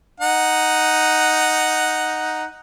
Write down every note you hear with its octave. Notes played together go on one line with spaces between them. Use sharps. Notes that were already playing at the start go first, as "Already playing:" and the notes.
D#4 F#5